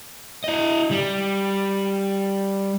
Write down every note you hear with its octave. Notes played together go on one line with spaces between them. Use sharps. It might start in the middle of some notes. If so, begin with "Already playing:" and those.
E4 D#5
G3